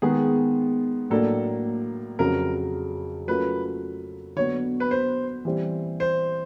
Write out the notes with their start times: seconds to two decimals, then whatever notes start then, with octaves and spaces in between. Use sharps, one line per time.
0.02 D#3 G#3 B3 G#4
1.10 A2 F#3 A#3 D4 A4
2.19 F2 C#3 F#3 A#4
3.27 F#3 A3 C#4 F4 A#4 B4
4.36 D3 F#3 B3 C#5
4.80 B4
4.91 C5
5.45 E3 G3 C4
6.00 C5